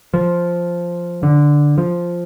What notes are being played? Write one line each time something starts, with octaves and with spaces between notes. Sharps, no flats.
F3
D3
F3